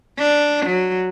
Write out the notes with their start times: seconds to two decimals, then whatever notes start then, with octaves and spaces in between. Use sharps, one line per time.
0.19 D4
0.66 F#3